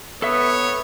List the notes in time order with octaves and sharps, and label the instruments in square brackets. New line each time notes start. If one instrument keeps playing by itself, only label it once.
[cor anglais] B3 [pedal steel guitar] A4 E5 E6 [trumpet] C#5